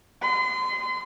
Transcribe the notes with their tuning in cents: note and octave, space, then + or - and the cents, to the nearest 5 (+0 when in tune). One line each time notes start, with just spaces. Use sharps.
C6 -35